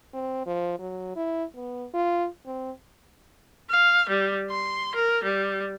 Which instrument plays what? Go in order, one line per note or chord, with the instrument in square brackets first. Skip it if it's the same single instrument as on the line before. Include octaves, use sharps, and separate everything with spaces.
[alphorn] C4
F3
F#3
E4
B3
F4
C4
[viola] F5
G3
C6
A#4
G3